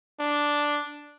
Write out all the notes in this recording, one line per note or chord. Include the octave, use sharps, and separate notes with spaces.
D4